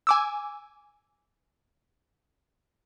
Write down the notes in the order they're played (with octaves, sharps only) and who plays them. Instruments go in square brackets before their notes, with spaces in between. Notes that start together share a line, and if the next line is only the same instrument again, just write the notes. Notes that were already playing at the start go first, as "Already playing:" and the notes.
[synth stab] G#5 D6 E6